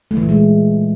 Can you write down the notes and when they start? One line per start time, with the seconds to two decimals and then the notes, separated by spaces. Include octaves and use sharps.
0.11 A3
0.17 E3
0.23 A#2
0.29 G#3